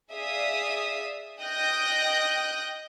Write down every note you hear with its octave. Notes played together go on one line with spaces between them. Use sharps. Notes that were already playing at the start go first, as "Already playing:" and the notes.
G#4 D5 E5 F5 D#6 B6
D#5 G5 D#6 F#6 G6 A#6